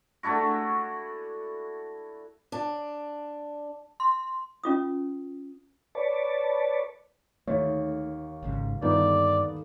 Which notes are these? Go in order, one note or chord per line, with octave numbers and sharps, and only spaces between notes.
A3 D4 E4 F#4
D4
C6
C#4 F4 D#6
B4 C#5 D5 A5
D#2 A3 C#5
G#1 G#2 C#3
G2 D#3 B3 D#4 A4 D5